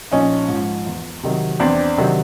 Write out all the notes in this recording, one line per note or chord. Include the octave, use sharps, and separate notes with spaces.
A#1 C#4 D#4
G#2 F3
E2
C3 D#3 F#3
E2 C4 D4
C3 D#3 F#3